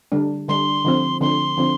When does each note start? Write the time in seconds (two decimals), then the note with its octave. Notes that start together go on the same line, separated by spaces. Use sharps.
0.12 D3 G3 D4
0.48 D3 G3 D4 C6
0.84 D3 F3 C4
1.21 D3 F3 C4 C6
1.57 D3 F3 C4